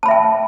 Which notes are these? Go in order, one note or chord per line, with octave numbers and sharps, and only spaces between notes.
E5 G5 A5 B5